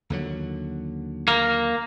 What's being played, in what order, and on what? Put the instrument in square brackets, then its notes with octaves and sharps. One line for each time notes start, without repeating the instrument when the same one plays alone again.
[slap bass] D#2 D3 F#3
[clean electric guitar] A#3